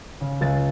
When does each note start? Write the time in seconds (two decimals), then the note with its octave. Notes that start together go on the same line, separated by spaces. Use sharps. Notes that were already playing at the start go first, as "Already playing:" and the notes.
0.21 C#3
0.41 C#2 A6